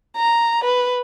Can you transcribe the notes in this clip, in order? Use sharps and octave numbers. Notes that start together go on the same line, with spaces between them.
A#5
B4